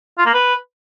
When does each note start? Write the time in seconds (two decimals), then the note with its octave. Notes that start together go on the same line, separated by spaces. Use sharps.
0.18 F4
0.26 A#3
0.34 B4